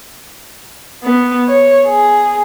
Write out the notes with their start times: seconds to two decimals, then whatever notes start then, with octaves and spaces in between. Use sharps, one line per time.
1.04 B3
1.48 C#5
1.87 G#4